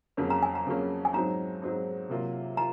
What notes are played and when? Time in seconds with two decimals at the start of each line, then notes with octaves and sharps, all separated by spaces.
0.17 F2 C#3 F#3 A#3 C#4
0.30 A#5
0.43 G#5
0.55 A#5
0.66 F2 C#3 F#3 A#3 C#4
1.05 G#5
1.13 G#2 F#3 C4 D#4 A#5
1.62 G#2 F#3 C4 D#4
2.09 C3 F#3 A#3 F4
2.57 F4 A#5